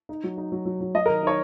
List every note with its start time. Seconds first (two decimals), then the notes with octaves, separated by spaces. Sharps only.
0.09 D#4
0.24 F#3
0.38 D#4
0.52 F#3
0.65 F#3
0.81 F#3
0.95 F#3 D#5
1.06 D#3 A#4
1.23 D#4 C#5